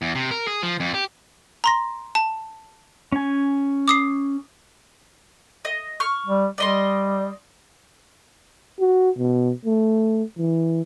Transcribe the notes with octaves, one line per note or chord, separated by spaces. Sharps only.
E2
C3
A#4
G#4
F3
F2
G4
A#5 C6 A#6
A5
C#4 G#5
D6 D#6 C7
D#5
C#6 F6
G3
G3 D5 D#5 C6
F#4
B2
A3
E3